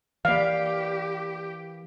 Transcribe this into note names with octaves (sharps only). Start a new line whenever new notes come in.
E3 A#3 G4 B4 D5 F5